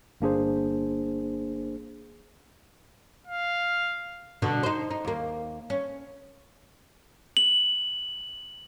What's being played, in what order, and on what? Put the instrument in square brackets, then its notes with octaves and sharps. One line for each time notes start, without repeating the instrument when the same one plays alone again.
[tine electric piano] G1 A#3 D4 G#4 C5
[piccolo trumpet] F5
[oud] B2 D3 D4
D#4 C5
D#4
D#2 A#3
C#4
[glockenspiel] F#7